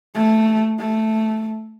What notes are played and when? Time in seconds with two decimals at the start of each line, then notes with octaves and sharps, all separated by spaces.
0.15 A3
0.79 A3